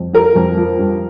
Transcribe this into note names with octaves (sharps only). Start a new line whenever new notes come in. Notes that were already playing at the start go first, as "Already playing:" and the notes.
Already playing: F2
F3 A#4
F2
F3
G2